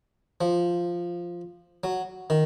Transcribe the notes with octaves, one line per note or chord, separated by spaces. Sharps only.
F3
F#3
D#3